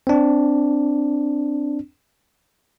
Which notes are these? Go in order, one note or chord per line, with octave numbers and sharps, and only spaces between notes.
C4 D4